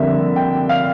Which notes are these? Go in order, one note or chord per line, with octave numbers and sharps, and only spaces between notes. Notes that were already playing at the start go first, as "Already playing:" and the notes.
Already playing: F2 D3 G3 A#3 E5
G5
F5